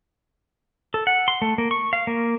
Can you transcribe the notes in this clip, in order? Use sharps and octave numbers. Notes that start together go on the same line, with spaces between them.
A4
F#5
C6
A3
A#3
C#6
F5
A#3